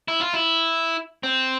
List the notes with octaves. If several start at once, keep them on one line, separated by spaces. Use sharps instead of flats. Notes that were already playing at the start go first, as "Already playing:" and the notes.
E4
F4
E4
C4